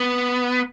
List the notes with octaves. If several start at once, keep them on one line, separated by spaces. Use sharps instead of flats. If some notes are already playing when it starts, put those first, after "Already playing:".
Already playing: B3